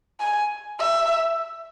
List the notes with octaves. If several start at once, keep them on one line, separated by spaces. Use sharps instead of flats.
G#5
E5